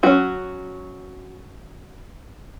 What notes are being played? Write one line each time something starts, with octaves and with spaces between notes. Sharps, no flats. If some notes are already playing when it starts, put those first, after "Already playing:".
F#3 C#4 F#4